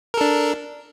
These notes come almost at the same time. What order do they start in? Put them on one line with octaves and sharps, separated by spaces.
A#4 A4 D4